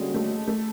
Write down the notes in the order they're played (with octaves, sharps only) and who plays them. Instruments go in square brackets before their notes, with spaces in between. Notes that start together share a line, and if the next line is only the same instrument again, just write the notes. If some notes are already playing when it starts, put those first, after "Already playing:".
Already playing: [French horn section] D3 G3 A#3 C#4 F#4 [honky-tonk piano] G#3
[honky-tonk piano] A3
A3